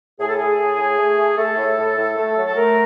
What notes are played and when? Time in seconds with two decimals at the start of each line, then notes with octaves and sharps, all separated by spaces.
0.19 A2 G#4
0.28 A4
0.38 A2 G#4
0.59 A2
0.78 A2
0.98 A3
1.17 A3
1.37 A3 A4
1.57 A2
1.77 A2
1.97 A2
2.17 A3
2.36 F#3
2.46 A4
2.55 A3 A#4